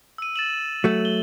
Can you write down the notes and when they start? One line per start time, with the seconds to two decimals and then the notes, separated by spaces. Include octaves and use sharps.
0.18 E6 D#7
0.36 A6 E7 F#7
0.84 F#3 A3
1.05 G7